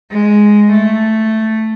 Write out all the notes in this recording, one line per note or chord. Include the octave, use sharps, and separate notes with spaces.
G#3
A3